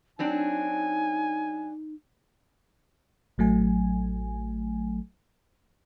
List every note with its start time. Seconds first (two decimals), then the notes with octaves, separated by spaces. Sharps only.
0.19 F#3 C4 D4 D#4 G#5
3.38 A1 F#3 A3 G#5